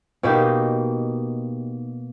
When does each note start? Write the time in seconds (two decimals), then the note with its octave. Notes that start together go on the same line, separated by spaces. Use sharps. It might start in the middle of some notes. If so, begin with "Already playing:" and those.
0.23 B2 A#3 D#4 G4